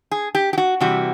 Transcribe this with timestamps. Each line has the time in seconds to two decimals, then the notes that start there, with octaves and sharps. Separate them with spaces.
0.11 G#4
0.35 G4
0.53 G4
0.58 F#4
0.80 C3 E3 G3 F#4